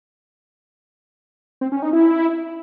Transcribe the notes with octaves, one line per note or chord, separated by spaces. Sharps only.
C4
C#4
D#4
E4